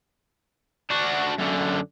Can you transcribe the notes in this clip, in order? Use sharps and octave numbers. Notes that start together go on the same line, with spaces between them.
D4 F#4
F#2 D3